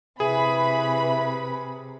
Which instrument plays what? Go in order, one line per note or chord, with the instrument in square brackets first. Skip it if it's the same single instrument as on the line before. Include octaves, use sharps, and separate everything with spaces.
[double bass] C3 [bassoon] E3 [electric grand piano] G#4 [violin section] B4 B5